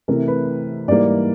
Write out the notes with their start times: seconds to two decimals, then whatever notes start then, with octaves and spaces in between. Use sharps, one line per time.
0.08 C3 E3 A3 A#4
0.28 B4
0.88 G#2 E3 G3 A#3 D5